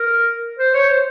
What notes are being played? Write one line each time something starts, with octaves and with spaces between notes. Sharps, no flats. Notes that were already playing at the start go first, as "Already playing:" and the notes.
Already playing: A#4
C5
C#5
C5